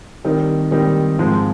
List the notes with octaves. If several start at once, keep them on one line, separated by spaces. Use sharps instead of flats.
D#3 G3 C4 D#4
D#3 G3 C4 D#4
G#2 F3 G#3 C4